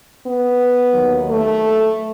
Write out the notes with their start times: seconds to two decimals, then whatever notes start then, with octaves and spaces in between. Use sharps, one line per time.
0.26 B3
0.94 D#2 D#3 F#3
1.28 A3